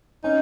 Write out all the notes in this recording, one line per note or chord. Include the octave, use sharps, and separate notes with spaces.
C#4 D#4